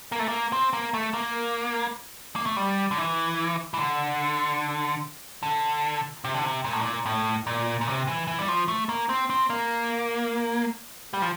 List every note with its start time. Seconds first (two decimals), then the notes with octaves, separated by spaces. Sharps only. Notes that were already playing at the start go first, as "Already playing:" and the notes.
0.12 A#3
0.19 A3
0.28 A#3
0.53 C4
0.73 A#3
0.94 A3
1.14 A#3
2.36 A#3
2.46 A3
2.57 G3
2.91 D3
2.98 E3
3.74 E3
3.80 D3
5.43 D3
6.24 C3
6.34 D3
6.44 C3
6.64 A#2
6.73 A2
6.80 A#2
7.06 A2
7.47 A#2
7.81 A#2
7.88 C3
8.07 E3
8.27 E3
8.39 G3
8.48 F3
8.68 A3
8.89 A#3
9.09 C4
9.30 C4
9.50 A#3
11.14 G3
11.22 F3